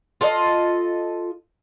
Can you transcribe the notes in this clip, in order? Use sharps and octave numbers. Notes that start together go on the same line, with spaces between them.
F4 A4 D5 D#5